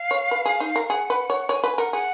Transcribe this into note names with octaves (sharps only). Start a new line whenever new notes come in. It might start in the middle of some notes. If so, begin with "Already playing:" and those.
Already playing: F5
C#5
B4
G#4
D#4
A#4
G#4 F#5
B4
C#5
C#5 G#5
B4 G#5
A#4 F#5
G#4 F#5